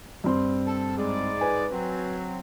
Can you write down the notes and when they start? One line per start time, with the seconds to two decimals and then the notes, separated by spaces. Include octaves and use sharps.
0.24 G2 C4 C6
0.66 A4
0.97 G#2 G#3 D5
1.41 B4 G#5
1.72 F#3 C4